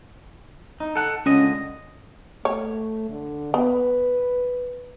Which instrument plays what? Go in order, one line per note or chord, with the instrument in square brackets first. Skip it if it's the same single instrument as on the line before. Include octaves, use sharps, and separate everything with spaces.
[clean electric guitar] D#4
A4 F#5
[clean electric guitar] C#2 D3 D#5 [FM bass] C#4
[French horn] A3 [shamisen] C#5
[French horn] D3
[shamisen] B3 [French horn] B4